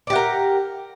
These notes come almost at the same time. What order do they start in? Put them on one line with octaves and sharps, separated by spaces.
D5 G4 F#5 A#4